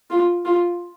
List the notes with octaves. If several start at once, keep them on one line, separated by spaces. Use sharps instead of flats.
F4
F4